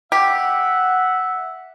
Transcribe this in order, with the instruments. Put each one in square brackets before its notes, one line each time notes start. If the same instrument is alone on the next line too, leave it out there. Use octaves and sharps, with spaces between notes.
[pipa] G4 [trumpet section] E5 F#5